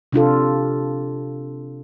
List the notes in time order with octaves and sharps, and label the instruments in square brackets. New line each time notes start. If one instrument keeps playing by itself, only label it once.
[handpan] C3 D4 F4 A4